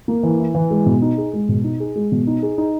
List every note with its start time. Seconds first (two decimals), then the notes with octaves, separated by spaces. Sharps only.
0.08 A#3
0.23 E3
0.40 E4
0.55 E3
0.70 G#3
0.86 B2
1.02 D#4
1.18 G#4
1.33 G#3
1.49 B2
1.64 D#4
1.80 G#4
1.95 G#3
2.12 B2
2.27 D#4
2.43 G#4
2.58 D#4